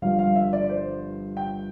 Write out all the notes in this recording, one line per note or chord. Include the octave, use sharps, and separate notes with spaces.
G1 G2 F3 F5
F5
E5
D5
C5
G5